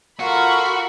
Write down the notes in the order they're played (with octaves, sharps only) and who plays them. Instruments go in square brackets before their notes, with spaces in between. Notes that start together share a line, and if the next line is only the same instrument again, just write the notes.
[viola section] F4 A4 A#4 [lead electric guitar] F#4 [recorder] F5 [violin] B5 C#6